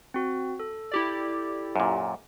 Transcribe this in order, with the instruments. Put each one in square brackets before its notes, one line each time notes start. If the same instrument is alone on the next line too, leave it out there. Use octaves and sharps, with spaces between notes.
[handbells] C4 F#4
A4
[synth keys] E4 G4 D5
[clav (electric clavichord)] F#2 A#2